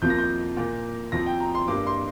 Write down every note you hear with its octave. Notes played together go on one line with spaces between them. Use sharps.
F2 F3 A#3 G6
A#6
G6
A#2 A#3
F2 F3 C4 A#6
G5
A#5
C6
G2 G3 A#3 D6
C6